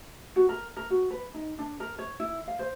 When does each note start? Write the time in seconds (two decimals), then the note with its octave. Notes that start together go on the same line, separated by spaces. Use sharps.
0.36 F#4
0.49 A#4
0.77 A#4
0.90 F#4
1.10 B4
1.34 D#4
1.59 D4
1.80 A#4
1.99 C#5
2.20 E4
2.48 F5
2.59 C5